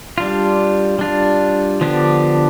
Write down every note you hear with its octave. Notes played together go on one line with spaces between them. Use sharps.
G3 D4 F4
G3 D4 F4
D3 F3 B3 D4 G4